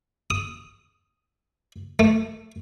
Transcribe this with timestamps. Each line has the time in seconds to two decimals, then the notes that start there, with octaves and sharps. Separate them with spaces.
0.30 D#6
1.99 A3